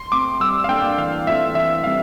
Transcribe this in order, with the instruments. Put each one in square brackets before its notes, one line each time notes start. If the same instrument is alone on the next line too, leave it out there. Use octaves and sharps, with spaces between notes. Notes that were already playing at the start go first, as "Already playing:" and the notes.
Already playing: [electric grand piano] C6
[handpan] A3 C4 [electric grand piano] D6
[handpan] G3 [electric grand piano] E6
[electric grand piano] F5
[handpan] A#3 D4 A4 D5 [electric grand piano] G5
[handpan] E3 [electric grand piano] F5
[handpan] A3 C4 F4 A4 [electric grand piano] E5
[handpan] E3 [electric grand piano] E5
[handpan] G3 C4 E4 [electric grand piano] F5